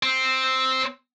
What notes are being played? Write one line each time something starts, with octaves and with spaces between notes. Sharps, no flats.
C4